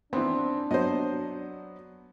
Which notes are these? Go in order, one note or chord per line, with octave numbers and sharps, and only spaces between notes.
E3 B3 C4 D4
F#3 B3 C5 D#5